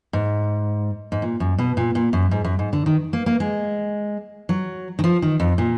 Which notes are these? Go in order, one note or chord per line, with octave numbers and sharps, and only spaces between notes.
G#2
G#2
A#2
F#2
B2
A#2
A#2
F#2
G#2
F#2
G#2
D3
D#3
A#3
A#3
G#3
F#3
D#3
F3
D#3
F2
A#2